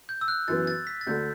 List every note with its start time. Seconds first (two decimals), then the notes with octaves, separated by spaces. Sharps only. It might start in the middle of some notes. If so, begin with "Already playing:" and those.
0.09 G6
0.21 E6
0.28 F#6
0.48 F#2 E3 B3 A6
0.67 A6
0.87 B6
1.01 A6
1.07 D2 D3 A3 G6